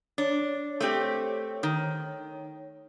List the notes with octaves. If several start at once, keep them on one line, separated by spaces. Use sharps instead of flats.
D4 C#5
A3 C4 G4
D#3